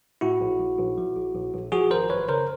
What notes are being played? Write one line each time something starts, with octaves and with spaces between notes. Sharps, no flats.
A2 E4 F#4
A#1
A#1
A#1
F3
A#1
A#1
A#1
F3 F#4 G#4
G#1 A#4 C5
F#2 B4 C#5
C#3 A#4 C5